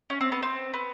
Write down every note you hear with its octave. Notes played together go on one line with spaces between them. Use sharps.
C#4
C4
B3
C4
B3